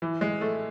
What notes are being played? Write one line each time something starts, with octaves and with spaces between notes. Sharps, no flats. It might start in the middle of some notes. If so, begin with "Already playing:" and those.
E3
G#3
A3